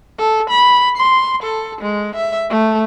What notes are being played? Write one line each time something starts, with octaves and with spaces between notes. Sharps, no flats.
A4
B5
C6
A4
G#3
E5
A3